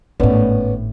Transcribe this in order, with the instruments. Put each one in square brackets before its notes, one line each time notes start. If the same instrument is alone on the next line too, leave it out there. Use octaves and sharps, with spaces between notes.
[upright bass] G#1 A2 [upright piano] B3 C#4 D5